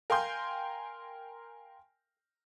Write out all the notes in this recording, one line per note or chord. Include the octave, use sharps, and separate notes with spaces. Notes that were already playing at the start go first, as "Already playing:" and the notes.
A#4 F5 G5 G#5 C6 G6